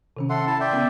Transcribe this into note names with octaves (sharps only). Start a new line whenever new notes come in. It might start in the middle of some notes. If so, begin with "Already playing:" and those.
C3 D#3 C#4
A4 E5 F#5 C6
E4 A5
D5 E5 G5
C#3 B3 C#4